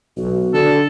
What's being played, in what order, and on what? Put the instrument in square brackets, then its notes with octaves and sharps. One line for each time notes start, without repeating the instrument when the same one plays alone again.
[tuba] B1 [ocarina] F#4
[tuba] D3 [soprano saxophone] A4